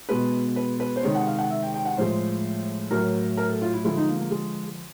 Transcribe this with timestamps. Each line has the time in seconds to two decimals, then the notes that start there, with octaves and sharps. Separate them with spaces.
0.09 B2 G#3 B4
0.56 B4
0.80 B4
0.96 C5
1.03 C3 D#3 G#3 C#5
1.15 F#5
1.27 F5
1.39 F#5
1.50 E5
1.62 G5
1.74 G5
1.85 F#5
1.97 A2 F3 G#3 C5
2.91 A2 F#3 A#4
3.37 A#4
3.49 A4
3.62 F4
3.74 E4
3.84 D3 F3 G#3 E4
3.97 D#4
4.08 A#3
4.20 A#3
4.31 G#3